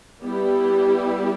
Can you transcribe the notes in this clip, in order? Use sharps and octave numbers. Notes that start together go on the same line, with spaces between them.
G3 B3 E4 G4